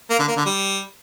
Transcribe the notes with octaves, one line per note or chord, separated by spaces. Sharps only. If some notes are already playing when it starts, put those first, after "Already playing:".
A#3
D3
A#3
D3
G3